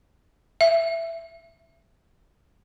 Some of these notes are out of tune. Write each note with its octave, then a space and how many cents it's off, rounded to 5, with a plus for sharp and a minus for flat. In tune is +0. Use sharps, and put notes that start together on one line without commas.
E5 +10